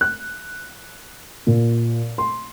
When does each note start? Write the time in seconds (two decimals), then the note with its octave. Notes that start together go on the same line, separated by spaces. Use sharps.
0.01 F#6
1.47 A#2
2.18 C6